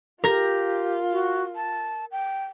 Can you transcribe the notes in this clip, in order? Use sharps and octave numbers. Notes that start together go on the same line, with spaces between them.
F4 G4 A#4 A#6
F#4
A5
G5